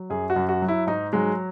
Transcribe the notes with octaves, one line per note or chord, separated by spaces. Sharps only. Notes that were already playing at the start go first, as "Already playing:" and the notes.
Already playing: F#3
F#2 G#4
F#4
F#2
F#4
F#3
E4
G#2 D#4
F#3 G#3